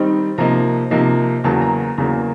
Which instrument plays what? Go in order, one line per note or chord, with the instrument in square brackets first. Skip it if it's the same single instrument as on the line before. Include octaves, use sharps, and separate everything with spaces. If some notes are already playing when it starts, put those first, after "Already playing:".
Already playing: [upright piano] D#3 G3 C4 D#4
C3 F3 A#3 D#4 A#5
C3 F3 A#3 D#4
E2 C#3 F#3 A#3 A5
A#5
A#5
E2 C#3 F#3 A#3 A#5